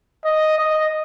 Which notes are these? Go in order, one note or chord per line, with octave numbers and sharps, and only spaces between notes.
D#5
D#5